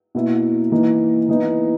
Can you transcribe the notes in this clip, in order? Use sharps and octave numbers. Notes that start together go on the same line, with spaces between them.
B2 A#3 E4
E3 A#3 D#4
E3 B3 D#4